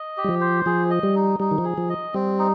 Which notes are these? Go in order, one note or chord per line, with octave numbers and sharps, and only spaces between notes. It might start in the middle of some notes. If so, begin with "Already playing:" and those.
Already playing: D#5
G4
G3
F3
C5
F3 G#4
D#5
G3
D#4
G3 D#4
D#3
F3
G#4
F3
D#5
G3 C4
D#4